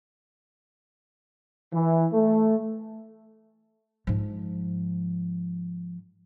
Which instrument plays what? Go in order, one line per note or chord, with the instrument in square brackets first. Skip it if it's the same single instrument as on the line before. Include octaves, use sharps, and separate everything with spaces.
[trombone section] E3
A3
[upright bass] G#2 F3